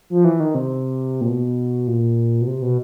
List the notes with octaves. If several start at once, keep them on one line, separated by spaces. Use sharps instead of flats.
F3
E3
D#3
C3
A#2
B2
A#2
B2
C3
B2